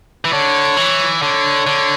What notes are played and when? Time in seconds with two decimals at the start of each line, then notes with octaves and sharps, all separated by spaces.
0.25 E3
0.32 D3 C#5
0.77 E3
1.22 D3 C#5
1.67 D3